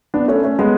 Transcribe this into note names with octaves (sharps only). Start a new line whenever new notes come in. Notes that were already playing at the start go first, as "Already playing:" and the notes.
B3 D4
A3 C#4
A3 C#4
G#3 B3